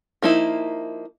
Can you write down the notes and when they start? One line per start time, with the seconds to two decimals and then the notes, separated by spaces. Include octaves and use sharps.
0.22 F3 A#3 D#4 E4